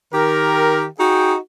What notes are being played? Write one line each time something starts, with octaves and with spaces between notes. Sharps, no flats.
D#3 G4 A#4
D#4 F#4 G#4 G5